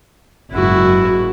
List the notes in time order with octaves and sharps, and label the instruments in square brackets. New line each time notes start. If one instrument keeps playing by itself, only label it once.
[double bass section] F#1 G#2 [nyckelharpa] E4 F#4